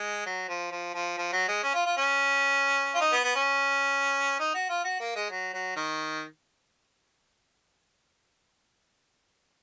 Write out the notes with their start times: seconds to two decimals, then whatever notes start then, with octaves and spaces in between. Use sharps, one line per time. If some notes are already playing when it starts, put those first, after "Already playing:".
Already playing: G#3
0.26 F#3
0.48 F3
0.72 F3
0.94 F3
1.18 F3
1.33 F#3
1.48 G#3
1.63 C#4
1.74 F4
1.86 F4
1.97 C#4
2.95 F4
3.01 D#4
3.13 B3
3.24 B3
3.36 C#4
4.39 D#4
4.54 F#4
4.69 F4
4.85 F#4
5.00 A#3
5.16 G#3
5.30 F#3
5.54 F#3
5.76 D#3